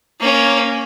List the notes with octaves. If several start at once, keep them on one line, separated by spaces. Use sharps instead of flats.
A#3 C#4